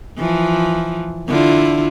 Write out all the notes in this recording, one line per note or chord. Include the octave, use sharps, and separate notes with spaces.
E3 F3
D3 E4 F4